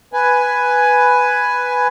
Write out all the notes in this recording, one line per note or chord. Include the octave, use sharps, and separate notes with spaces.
B4 G#5